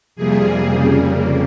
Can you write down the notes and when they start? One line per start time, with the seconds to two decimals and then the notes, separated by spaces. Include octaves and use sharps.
0.15 F2 C3 G3 A#3 G#4
0.67 F2 C#3 G3 A#3